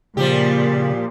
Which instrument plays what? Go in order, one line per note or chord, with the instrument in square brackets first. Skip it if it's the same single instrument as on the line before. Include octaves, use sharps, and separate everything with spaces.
[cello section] A#2 [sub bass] C#3 [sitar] F3 G3 G4